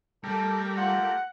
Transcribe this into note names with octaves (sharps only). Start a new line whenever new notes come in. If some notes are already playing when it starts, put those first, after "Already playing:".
G3 A3 G4 A4 A#4
F4 F#5